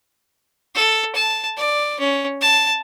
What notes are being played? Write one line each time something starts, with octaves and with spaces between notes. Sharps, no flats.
A4
A5
D5
C#4
A5